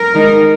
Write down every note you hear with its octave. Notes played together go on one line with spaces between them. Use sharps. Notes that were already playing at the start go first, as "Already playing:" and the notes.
Already playing: A#4
D#3 G#3 D#4